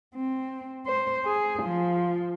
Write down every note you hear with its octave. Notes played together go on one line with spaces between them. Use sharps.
C4
C5
G#4
F3